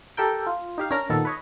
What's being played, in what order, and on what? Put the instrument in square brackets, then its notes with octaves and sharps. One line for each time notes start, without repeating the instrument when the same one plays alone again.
[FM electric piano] G4 A4 A#4 G5
F4
D#4 G4 F5
C#4 D4 A#4 A#5
A#2 D#3 B3 A4
B4 C#5 D#5